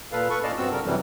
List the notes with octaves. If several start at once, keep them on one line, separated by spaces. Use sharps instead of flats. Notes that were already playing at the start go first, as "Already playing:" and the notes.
A#2 A4 B4 F5
A4 B4 C#6
A#2 C#4 D5 D#5 F5 A5
G2 B3 C4 F#4 E6
C#3 G3 A4 A#4
F#2 C3 E3 F#3 G3